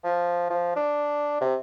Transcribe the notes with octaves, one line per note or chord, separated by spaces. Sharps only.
F3
F3
D4
C3